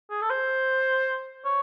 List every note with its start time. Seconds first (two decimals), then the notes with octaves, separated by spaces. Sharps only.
0.11 G#4
0.21 A4
0.30 C5
1.45 C#5